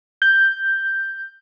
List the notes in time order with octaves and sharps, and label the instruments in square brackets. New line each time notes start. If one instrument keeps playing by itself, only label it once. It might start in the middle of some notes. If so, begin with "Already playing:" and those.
[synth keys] G6